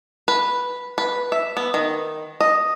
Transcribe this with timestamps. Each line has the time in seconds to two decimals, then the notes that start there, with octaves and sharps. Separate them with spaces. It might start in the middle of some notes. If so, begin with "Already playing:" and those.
0.28 B4
0.98 B4
1.32 E5
1.57 B3
1.74 D#3
2.41 D#5